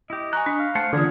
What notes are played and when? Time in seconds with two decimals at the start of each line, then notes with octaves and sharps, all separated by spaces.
0.10 E4 G4 D#5
0.33 G#5 A#5 C#6 F#6
0.46 D4
0.59 F5
0.75 A3 C5 F#5 A5
0.93 D3 E3 A#3 C#4 F4 G#4